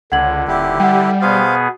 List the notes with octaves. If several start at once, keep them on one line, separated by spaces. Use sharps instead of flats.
C#2 D3 F#5 G#6 F#7
D#1 E4 G4
G3 F#5 G5
B2 B3 G#4 C5 F5